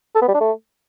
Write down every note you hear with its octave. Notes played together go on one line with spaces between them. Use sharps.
A4
B3
G3
D4
A3